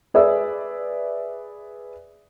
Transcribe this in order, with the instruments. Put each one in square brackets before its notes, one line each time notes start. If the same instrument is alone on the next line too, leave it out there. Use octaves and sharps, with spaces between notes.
[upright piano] G#4 B4 D5 E5 E6